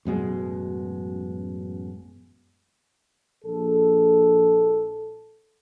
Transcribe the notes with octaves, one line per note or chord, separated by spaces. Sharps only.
A1 F#2 B2 G#3
A#1 A4